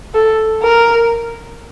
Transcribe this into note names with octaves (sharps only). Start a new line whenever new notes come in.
A4
A#4